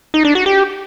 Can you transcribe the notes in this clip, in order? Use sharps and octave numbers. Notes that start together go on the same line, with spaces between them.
D#4
D4
F#4
G4